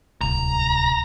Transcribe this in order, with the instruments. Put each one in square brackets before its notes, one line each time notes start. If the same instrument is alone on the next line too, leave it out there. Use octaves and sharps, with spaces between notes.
[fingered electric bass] D1 C2 [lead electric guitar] A#5